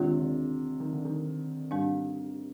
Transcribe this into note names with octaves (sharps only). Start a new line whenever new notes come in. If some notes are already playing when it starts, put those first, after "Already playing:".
Already playing: D#2 C3 D#3 G#3 D4 F4
D3
D#3
D3
C3 D#3
G#2 G3 D4